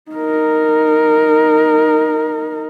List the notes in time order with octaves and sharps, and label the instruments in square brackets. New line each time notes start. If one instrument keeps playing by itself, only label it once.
[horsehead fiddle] D#4 A#4